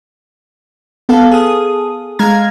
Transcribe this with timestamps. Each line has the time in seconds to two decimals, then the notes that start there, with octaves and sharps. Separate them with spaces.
1.09 B3 A4 F5
1.31 G#4 D#6
2.19 G#3 F5 A#5 G#6